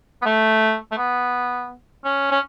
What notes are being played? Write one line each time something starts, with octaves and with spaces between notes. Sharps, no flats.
B3
A3
A3
B3
C#4
C#4